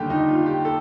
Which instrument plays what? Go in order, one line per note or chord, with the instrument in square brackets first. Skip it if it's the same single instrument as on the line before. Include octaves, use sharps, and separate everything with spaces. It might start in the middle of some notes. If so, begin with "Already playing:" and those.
Already playing: [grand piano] D#2 D3 G3 G4
D#4
F4
G4
A4